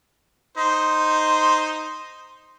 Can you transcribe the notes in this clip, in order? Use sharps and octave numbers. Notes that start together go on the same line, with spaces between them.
D#4 C5